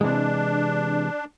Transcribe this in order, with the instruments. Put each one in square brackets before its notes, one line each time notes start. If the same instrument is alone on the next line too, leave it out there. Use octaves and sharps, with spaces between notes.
[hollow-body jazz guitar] C3 E3 G#3 [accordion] D4